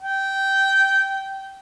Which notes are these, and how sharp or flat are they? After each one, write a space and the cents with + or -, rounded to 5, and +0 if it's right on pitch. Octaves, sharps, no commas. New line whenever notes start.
G5 -15